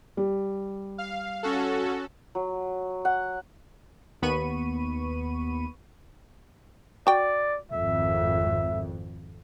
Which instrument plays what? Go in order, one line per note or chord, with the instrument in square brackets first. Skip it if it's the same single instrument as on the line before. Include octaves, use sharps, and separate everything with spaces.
[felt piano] G3
[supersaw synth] F5
C#4 F#4 A4
[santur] F#3
F#5
[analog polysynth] D#2 B3 B5 C#6 D#7
[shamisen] F#4 G5 [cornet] D5
[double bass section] G#1 F2 [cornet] E5